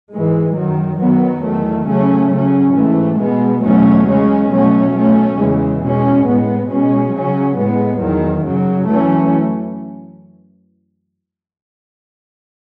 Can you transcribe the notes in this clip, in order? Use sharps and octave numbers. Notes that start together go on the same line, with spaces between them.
G#2 E3 G#3
F#2 D#3 F#3
F#2 D#3 F#3 B3
E2 D#3 A3
C#3 F#3 A3 C#4
C#3 F#3 C#4
G#2 E3 A3
B2 G#3 B3
E2 B2 F#3 A3 C#4
C#3 G#3 C#4
B2 F#3 A3 C#4
B2 A3 C#4
E2 C#3 E3 G#3
B2 G#3 C#4
A2 G#3 B3
B2 G#3 C#4
C#3 F#3 C#4
A2 G#3 B3
E2 D#3 F#3
F#2 C#3 F#3
F#2 E3 A3 C#4